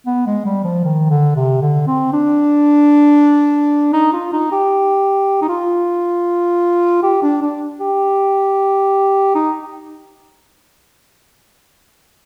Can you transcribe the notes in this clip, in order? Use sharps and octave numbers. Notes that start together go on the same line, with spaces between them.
B3
G#3
G3
F3
D#3
D3
C3
D3
C4
D4
D#4
F4
D#4
G4
D#4
F4
G4
D4
D4
G4
D#4